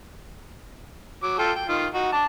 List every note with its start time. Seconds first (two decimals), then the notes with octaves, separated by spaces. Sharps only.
1.23 F#3 D6
1.39 F4 A4 G5
1.56 G5
1.69 D#3 F4
1.94 D#4 F#4
2.13 A5 D6